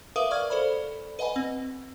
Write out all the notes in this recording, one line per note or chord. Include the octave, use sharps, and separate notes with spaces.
A#4 B4 E5 F5 D6 D#6
D5 F5 C#6 F6 G#6
A4 C5 D5 B5
B4 D#5 F#5 G#5 B5
C4